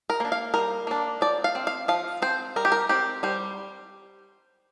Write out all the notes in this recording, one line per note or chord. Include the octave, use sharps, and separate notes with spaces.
A#4
A#3 D4
F5
G3 A#4
A#3 D4
F3 D5
F5
C4
F5
F3 F5
C4 C5
G3 A#4
G4
A#4
C4 G4
G3 C5